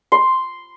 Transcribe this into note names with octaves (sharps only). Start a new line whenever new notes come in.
C6